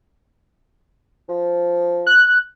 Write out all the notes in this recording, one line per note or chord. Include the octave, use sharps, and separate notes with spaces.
F3
F#6